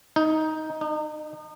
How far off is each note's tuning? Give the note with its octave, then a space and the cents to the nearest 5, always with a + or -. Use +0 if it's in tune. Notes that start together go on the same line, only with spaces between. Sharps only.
D#4 +10
D#4 -35